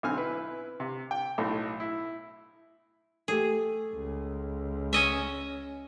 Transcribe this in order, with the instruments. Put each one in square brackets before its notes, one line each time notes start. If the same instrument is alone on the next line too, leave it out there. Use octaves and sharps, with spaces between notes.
[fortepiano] B1 D3 C4 G#5 F6
E4 B4
C3
G5
B1 A2
E4
[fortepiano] A3 G4 [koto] G#4
[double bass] C#2
[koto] C#4 D#5 E5